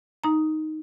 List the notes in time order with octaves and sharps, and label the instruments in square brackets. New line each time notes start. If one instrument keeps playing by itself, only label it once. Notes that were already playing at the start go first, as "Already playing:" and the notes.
[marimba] D#4 A#5